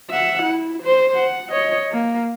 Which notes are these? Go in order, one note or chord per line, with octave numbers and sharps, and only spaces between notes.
E5 F#5
E4
C5
F#5
C#5 D#5
A#3